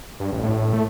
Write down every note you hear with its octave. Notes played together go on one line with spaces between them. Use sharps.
G2
A1
A2
A3